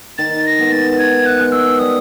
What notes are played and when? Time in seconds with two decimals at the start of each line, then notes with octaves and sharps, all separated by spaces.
0.18 D#3 A6
0.46 A#6
0.58 G#3 B3
0.72 A6
0.98 D#3 G#6
1.26 F#6
1.39 G#3 B3
1.52 E6
1.79 G3 D#6